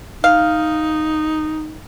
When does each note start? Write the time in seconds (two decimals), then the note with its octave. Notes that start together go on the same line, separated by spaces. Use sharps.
0.24 D#4 F5